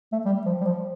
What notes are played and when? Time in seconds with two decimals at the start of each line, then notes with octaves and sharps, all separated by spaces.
0.12 A3
0.25 G3
0.45 F3
0.61 G3
0.65 F3